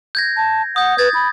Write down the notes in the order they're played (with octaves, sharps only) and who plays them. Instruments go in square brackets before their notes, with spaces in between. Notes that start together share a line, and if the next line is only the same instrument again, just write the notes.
[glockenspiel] G6 G#6 A#6
[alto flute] A5
[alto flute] F#5 [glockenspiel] D#6 G6
[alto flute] B4 [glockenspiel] G#6 A6
[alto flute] B5